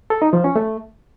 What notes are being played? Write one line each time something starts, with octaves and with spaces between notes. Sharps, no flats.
A4
D#4
F3
C#4
A3